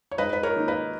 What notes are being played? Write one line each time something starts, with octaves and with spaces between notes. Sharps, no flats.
C#5
G#2 B4 D#5
B4
A#4 C#5
D#3 A#3 D#4
B4 D#5